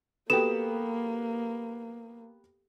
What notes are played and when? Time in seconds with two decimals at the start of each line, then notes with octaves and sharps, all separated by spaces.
0.30 A#3 B3 F#4 G4 A4 E7